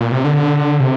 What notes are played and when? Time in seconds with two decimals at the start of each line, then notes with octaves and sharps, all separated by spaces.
0.01 A#2
0.12 C3
0.24 D3
0.80 C3